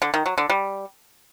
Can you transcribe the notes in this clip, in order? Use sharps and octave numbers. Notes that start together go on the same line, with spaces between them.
D3
D#3
F#3
D3
G3